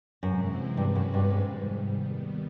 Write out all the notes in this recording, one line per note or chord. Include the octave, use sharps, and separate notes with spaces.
F#2 C3 E3 G#3 C4 E4
G2 B2 G#3 C#4 F#4 B4
F#2
G2
F2 G#2 C3 D#3 G3
D#2 D#3 G3 B3